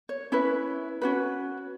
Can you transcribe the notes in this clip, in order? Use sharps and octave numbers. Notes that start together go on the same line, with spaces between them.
C#5
C#4 E4 B4
C#4 F#4 B4